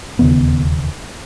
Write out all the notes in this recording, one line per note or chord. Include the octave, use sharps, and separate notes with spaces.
E1 D#2 C#3 B3